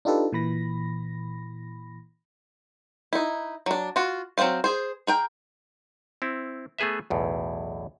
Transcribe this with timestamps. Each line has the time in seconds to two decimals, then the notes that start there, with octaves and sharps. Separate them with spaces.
0.05 D4 D#4 F4 G4 A4 B4
0.32 A#2 E3 B5 A#6
3.13 D#4 E4
3.66 F#3 D4
3.96 F4 F#4
4.38 F#3 C4 F#4 C5 F5
4.64 G#4 C5
5.07 G#4 A#4 G5
6.22 C4 E4
6.79 A3 B3 G#4 B4 E5
7.10 B1 E2 A2